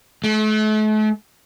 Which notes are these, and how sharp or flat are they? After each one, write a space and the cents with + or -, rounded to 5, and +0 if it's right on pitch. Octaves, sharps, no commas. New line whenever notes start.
A3 -40